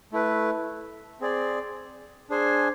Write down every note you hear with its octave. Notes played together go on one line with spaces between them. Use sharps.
A3 E4 B4
C4 G#4 D5
D4 G#4 C5 G#5